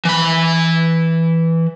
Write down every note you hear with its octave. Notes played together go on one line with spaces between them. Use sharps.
E3 B5